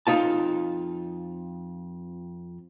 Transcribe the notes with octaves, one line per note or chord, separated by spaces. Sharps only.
F2 D#4 F4 A5